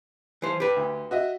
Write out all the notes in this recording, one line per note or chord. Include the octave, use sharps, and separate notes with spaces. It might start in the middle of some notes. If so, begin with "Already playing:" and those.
E3 C5
G4 B4
D2
F#4 D#5 E5